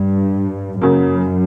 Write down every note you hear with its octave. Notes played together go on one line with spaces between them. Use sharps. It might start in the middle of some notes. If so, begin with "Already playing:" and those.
Already playing: G2
F#2 C#3 F#3 A#3